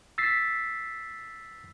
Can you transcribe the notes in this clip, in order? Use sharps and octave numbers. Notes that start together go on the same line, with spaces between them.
E6 A6 B6 C7